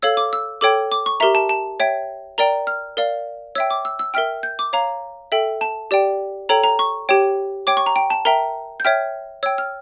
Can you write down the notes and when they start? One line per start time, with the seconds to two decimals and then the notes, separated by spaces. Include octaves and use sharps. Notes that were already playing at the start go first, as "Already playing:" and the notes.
0.02 A4 C#5 F5 E6
0.17 D6
0.33 E6
0.61 A4 C#5 G5 D6
0.92 D6
1.06 C#6
1.20 G4 A#4 E5 A#5
1.35 A5
1.49 A5
1.80 C#5 E5 G5
2.38 A#4 D5 G5 A#5
2.67 F6
2.97 A#4 D5 F5
3.55 C#5 E5 G5 E6
3.70 D6
3.85 E6
3.99 E6
4.14 A#4 E5 G5 F6
4.43 G6
4.59 D6
4.73 C#5 F5 A#5
5.32 A4 E5 G5
5.61 A5
5.91 G4 D5 G5
6.49 A4 C#5 G5 A#5
6.63 A#5
6.79 C#6
7.09 G4 C#5 G5
7.67 C#5 G5 D6
7.77 C#6
7.86 A#5
7.96 G5
8.10 A5
8.25 A#4 E5 G5 A#5
8.80 G6
8.85 C#5 E5 G5 F6
9.43 C#5 G5 E6
9.58 F6